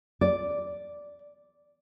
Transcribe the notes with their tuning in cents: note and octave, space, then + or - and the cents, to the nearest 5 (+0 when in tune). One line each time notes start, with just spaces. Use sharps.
D5 -5